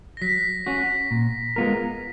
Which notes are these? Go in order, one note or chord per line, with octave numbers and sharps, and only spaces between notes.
A#6
F#3 B6
C#4 F#4
A#2
G#3 B3 F4 A#4